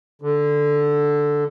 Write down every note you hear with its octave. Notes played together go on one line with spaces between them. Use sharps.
D3